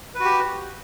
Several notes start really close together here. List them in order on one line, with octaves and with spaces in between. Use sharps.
B4 F#4 G4